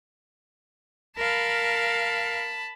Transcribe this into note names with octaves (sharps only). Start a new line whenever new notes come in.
A#4 F5 A5 B5